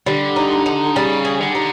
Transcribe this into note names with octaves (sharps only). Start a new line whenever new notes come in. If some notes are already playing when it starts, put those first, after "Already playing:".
D3 G3
D#4
D#4
C#3 G3
G#4
D3
D#4